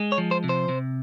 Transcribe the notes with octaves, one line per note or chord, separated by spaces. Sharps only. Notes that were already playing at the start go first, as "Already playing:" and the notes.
Already playing: G#3
C#5
F3
C5
C3
C5
C3